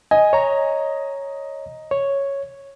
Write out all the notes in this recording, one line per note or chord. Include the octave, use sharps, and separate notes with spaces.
D#5 G#5
C#5 A#5
C#5